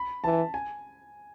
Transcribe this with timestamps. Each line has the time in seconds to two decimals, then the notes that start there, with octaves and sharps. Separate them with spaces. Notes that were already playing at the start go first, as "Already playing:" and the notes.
Already playing: B5
0.24 E3 A5
0.54 G#5